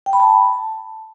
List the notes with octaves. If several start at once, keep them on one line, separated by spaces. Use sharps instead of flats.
G5
B5
A5